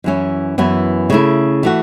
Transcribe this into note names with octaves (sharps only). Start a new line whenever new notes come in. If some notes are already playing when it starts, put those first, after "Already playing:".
F#2 E3 C#4 E4
F#2 E3 B3 E4
C#3 A3 E4
E3 A3 F#4